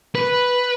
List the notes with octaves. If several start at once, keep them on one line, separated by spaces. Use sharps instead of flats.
B4